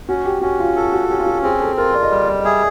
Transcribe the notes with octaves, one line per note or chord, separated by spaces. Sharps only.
C#4 F#4
G4
C#4 F#4
F4
F4 A4
F#4
C#4 G4
F4
F#4
C4 G#4
A4
F4 A#4
D5
D#5
G3 D5
D#5
D#5
G#4 E5